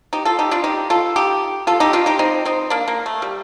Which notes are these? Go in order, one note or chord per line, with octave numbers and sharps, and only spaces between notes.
D#4 G4
F4 A4
D#4 G4
D4 F4
D#4 G4
F4 A4
D#4 G4
F4 A4
D#4 G4
D4 F4
D#4 G4
C4 D#4
C4 D#4
A#3 D4
A#3
A3
G3